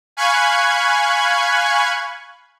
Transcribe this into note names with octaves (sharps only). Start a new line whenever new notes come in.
F5 G#5 B5 C#6 F#6 G#6